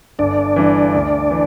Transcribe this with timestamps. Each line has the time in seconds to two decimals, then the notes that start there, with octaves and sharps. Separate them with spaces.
0.19 G1 D4 D5
0.56 G2 E3
0.94 D2
1.31 E3